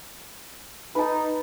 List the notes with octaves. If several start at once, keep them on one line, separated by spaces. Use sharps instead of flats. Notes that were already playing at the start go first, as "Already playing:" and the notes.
D#4 B4 A5